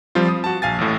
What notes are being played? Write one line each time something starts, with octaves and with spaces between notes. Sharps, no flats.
F3 G3 C4 F4
D#6
F#4 A5
A#1 F5 G#5 A6
A1 A2